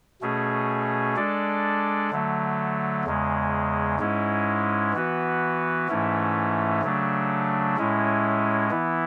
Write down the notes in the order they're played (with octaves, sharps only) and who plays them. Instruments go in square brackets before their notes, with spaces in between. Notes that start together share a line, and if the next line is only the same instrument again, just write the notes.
[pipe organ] B2 A3 C#4 G#4
G#3 D4 A4 D5
D3 F#3 A3
E2 C#3 G#3
G#2 G#3 C#4 E4
E3 B3 F#4 B4
G#2 E3 A3 C#4 E4
C#3 F#3 A3 D4
A2 G#3 C#4 E4
E3 B3 E4